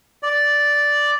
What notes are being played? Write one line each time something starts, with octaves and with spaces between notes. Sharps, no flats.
D5